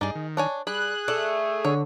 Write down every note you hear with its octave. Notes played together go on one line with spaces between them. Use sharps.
G2 D#4 G#4 D5
D#3
D4 C#5 G#5
G3 G#4 B5 F#6
A3 D5
D3 C#5